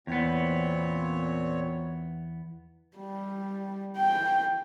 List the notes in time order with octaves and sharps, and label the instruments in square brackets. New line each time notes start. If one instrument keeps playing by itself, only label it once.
[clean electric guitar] E2 B3 [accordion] A#2 C4 C#5
[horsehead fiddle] G3
G5